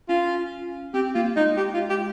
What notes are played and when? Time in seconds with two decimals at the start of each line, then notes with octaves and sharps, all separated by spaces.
0.09 C#4 F4
0.94 C4 G4
1.15 A#3 F4
1.36 G#3 D#4
1.57 G4
1.74 F4
1.89 G4